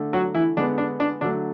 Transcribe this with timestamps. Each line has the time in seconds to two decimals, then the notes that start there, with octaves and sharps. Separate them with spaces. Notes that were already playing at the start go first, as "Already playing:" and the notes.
Already playing: D3 A3
0.13 F#3 F#4
0.35 E3 E4
0.57 D3 G#3 B3 D4
0.78 D4
1.00 D4
1.21 D3 F#3 A3 D4